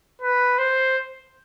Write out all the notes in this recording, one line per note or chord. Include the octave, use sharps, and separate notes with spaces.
B4
C5